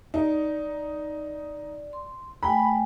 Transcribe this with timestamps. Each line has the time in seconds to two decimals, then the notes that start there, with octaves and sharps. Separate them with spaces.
0.14 D#4 D5
1.93 C6
2.43 A3 G5 G#5 B5